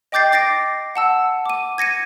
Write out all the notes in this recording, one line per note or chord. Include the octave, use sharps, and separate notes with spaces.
D#5 G5 D6 G6 A6 C7
D6 A6 A#6 C7 D7
F#5 A5 E6
D6 D#7
G#6 A#6 C#7 D#7